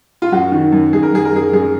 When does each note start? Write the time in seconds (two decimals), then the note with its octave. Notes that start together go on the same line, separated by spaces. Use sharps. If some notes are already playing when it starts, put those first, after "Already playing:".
0.22 F4
0.32 F#2 F#4
0.52 D#3
0.72 F#2
0.93 F#2 G#4
1.03 A#4
1.13 F#2 G#4
1.25 A#4
1.32 F#2 G#4
1.53 F#2 G#4